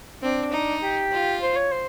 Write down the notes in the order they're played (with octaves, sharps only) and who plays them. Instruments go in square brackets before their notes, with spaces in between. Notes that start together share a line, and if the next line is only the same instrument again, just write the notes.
[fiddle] C4 [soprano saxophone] D4
[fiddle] D#4
[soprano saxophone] G4
[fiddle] F4
[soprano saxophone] C5
C#5
C5